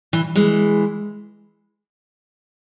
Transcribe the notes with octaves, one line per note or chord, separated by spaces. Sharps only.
E3
E3 G#3